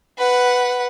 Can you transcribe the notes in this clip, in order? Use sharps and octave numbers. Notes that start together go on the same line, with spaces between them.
B4 F#5